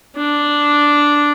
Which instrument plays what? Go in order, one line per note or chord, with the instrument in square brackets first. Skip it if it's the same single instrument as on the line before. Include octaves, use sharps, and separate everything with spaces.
[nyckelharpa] D4